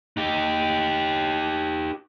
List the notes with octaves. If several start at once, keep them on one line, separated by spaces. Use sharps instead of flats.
D#4 G4